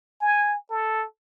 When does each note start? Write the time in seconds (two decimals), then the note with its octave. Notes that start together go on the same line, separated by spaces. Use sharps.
0.21 G#5
0.71 A4